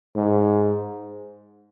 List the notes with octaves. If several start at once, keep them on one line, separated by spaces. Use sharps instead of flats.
G#2